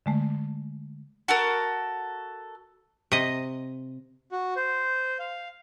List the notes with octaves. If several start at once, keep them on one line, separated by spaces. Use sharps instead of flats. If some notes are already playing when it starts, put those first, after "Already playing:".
D3 G#3 A3
F#4 A4 A#4
C3 D#5
F#4
C5
F5